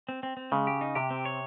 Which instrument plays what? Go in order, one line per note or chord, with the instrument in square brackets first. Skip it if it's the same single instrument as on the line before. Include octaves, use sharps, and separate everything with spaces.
[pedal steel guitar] C4
C4
C4
[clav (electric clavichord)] C#3 [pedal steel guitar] G#3
[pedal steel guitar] G4
D#4
[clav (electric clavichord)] C3 [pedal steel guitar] G4
[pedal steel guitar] C4
C#5